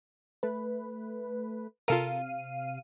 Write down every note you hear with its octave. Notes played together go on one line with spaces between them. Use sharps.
A3 B4
C3 F4 A4 A#4 F5 D#7